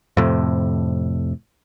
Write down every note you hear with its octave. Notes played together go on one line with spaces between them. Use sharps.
F2 A2 C3